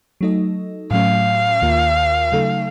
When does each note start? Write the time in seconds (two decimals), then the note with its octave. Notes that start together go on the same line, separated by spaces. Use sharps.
0.21 F#3 A3 D#4 A4 D#5
0.91 A2 F#3 A3 C#4 F5
1.62 D#2 D#3 A#3 F4 A#4
2.32 C#3 F#3 A3 D#4 A4